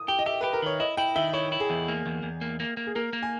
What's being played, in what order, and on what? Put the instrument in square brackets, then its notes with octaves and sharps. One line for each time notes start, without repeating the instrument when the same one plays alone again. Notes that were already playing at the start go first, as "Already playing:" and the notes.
Already playing: [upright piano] D#6
[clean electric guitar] G4 [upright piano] G5
[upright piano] D#5
[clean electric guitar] G4 [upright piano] E5
[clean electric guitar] G4 [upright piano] B4
[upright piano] A#4
[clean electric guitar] D#3 [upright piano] C#5
[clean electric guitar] E4 [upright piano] D#5
[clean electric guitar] E4 [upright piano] G5
[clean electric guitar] D#3 [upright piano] E5
[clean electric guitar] E4 [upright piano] C#5
[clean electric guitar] E4
[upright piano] G#4
[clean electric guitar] E2
A#3
E2
E2
A#3
A#3
A#3
[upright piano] G#4
[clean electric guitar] A#3 [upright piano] A#4
[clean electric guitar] A#3
[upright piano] G#5